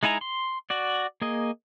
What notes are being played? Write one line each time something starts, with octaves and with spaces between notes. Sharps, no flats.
G#3 D#4 E4 G#5 A#5
C6
F#4 D5
A#3 G#4 D#5